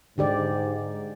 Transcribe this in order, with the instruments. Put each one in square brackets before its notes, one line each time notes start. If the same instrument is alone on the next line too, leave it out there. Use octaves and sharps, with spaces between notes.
[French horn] G#2 [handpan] D3 G4 D5